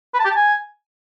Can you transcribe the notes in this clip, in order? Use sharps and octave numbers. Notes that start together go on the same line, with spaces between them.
B4
A5
G4
A5
G#5